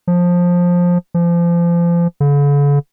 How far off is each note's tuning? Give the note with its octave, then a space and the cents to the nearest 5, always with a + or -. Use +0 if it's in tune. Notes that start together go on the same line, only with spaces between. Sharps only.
F3 +15
F3 -30
D3 -45